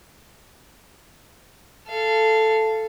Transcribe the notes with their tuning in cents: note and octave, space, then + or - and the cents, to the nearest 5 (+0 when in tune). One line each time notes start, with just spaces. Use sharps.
A4 +0 F5 -25